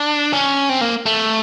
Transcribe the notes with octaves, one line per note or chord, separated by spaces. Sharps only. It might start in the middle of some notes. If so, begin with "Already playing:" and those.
Already playing: D4
C#4
C4
A#3
A3